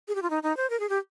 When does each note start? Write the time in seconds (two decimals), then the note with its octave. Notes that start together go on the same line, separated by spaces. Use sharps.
0.08 G#4
0.15 G4
0.22 F4
0.30 D#4
0.43 D#4
0.57 C5
0.70 A#4
0.80 G#4
0.89 G4